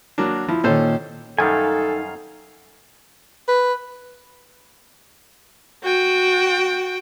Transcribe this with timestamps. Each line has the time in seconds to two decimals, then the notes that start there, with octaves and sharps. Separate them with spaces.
0.18 F#3 A#3 D4
0.48 F3 E4
0.64 A#2 D#3 C#4 A4 C5
1.39 F#2 D#3 G3 D#4 A4 F5 G#5
3.48 B4
5.83 F#4 G5